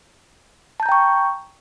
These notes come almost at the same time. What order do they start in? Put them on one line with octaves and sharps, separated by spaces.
A5 G6 A#5 G5 C#6